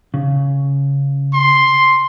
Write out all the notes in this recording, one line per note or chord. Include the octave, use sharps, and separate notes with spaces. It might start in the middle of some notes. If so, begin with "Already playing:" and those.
C#3
C6